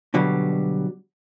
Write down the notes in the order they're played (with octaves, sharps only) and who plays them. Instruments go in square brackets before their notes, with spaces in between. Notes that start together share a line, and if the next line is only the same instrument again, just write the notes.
[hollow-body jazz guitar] B2 D3 F#3 G3